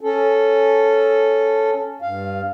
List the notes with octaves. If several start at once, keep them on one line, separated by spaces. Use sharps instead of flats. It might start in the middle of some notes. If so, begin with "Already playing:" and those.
C#4 A4
G2 F5